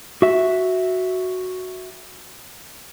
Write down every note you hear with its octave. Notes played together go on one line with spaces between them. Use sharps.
F#4 E5